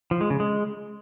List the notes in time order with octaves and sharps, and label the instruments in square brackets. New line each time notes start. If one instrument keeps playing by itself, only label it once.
[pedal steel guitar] F3
G#3
C#3
G#3